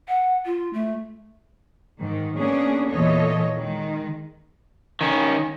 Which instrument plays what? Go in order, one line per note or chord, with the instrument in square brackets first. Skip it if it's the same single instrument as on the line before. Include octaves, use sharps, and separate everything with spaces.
[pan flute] F#5
F4
A3
[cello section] G#2 D#3
A#3 B3 C#4 D4 G#4
E2 A#2 E3 A4 C#5 D#5
D#3 G#3
[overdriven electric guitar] D#3 C#4